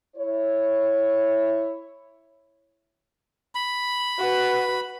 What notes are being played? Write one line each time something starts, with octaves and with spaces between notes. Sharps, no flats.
E4 C#5
B5
F#4 B4